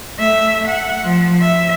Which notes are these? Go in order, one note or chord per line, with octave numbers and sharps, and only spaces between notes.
A3 E5
F#5
F3
E5